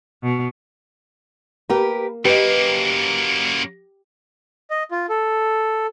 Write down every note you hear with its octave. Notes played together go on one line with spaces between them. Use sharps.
B2
A#3 G4 A#4 B4
F#2 A#3 G4 B4 D#5
D#5
F4
A4